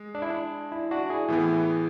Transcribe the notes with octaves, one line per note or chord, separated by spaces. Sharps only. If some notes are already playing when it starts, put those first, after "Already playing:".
Already playing: G#3
D4
E4
D4
E4
D4 F#4
E4 G#4
A2 E3 B3